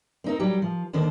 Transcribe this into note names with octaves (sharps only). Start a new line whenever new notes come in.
C4 D#4 A#4
F#3 G3 G4
F3
D#2 D3 D#3 C5